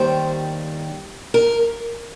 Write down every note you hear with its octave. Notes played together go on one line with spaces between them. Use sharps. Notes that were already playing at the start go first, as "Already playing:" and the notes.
Already playing: D#2 D#3 G3 C5
A#4